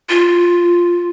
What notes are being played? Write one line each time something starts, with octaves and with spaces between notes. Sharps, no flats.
F4